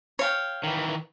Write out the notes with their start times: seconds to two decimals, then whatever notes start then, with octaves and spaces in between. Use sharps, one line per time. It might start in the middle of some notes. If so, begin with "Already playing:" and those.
0.19 C#5 F5 G5
0.64 D#3 E3